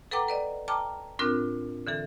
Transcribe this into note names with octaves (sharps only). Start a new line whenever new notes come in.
A4 B4 F#5 G5 A#5 D6
B4 D5 D#5
G5 A5 A#5 D6 F6
A2 C4 D4 F4 A#4 F#6
D3 E3 A4